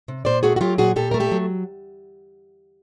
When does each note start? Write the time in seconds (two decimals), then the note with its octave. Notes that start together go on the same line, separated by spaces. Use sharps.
0.08 C3
0.25 A#2 C5 D5
0.43 A3 F#4 G#4
0.56 F#4
0.61 F#3 F4 G4
0.78 A#2 F#4 G#4
0.96 A#2 G4 A4
1.11 A3 A#4
1.20 G4 A4
1.32 F#3